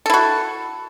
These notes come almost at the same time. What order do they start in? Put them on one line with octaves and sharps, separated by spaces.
A4 E4 F#4